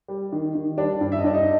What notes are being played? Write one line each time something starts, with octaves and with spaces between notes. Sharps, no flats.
G3
D#3
D#3
G3 D4 D5
G2
E5
D#5
G2 D5
D#4 D#5